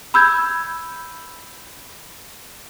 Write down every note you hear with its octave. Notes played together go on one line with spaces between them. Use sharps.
B5 E6 G6 G#6